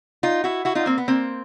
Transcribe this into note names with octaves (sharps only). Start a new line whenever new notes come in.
D#4 F4
E4 F#4
E4 F#4
D#4 F4
A#3 C4
B3
A#3 C4